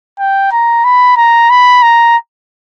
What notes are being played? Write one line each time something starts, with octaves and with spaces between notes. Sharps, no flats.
G5
A#5
B5
A#5
B5
A#5